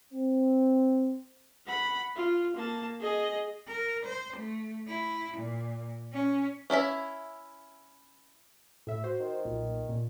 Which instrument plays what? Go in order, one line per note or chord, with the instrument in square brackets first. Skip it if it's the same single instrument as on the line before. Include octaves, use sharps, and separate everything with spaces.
[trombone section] C4
[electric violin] F#5 B5
F4
A#3 A5
G#4 D#5
[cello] A#4
C5
A3
E4
A#2
C#4
[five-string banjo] C#4 E4 F4 E5
[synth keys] A2 E5
F#4 C5
[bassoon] D#3
[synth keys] B1 A#2
A#2